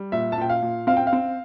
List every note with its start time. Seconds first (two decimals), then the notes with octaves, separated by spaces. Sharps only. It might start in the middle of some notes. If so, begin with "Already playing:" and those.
Already playing: G3
0.12 A#2 E5
0.32 A5
0.38 A#2 G5
0.50 F5
0.62 A#2
0.87 C4 F5
0.97 G5
1.07 F5
1.13 C4